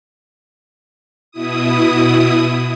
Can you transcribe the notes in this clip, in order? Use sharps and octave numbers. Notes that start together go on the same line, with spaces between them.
B2 E4 D#6